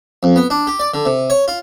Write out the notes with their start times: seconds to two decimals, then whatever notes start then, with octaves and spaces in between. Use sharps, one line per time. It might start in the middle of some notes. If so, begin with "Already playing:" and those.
0.23 F2
0.36 B3
0.50 D4
0.67 G4
0.80 D5
0.94 D3
1.05 C3
1.30 C#5
1.48 F4